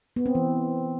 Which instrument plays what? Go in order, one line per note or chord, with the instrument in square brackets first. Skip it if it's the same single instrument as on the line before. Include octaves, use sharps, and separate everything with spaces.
[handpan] B3
C4
E3